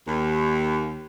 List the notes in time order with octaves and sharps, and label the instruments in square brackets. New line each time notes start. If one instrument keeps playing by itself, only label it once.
[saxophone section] D#2